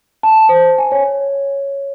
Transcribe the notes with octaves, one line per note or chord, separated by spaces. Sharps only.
A5
C5
G#5
C#5